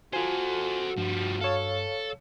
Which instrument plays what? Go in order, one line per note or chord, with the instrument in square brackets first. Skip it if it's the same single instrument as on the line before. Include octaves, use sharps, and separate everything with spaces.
[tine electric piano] F4 G#5 [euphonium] F#4 [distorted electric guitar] A4 C5
[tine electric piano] G2 [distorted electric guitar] F3 G3
[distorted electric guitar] A4 [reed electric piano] C#5 F5